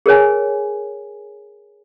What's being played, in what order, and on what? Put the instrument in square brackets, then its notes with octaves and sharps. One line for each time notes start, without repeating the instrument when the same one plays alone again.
[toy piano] G#4 A#4 C#5 G#5